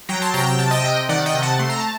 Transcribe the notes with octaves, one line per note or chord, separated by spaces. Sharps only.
F#3 G5 A#5
A5 C6
C3 G5 A#5
G5
C3 A5
D#5 G5
C3
D#3 D5 F#5
D#5 G5
C3
F#5 A5
A3 C6
A#5
A5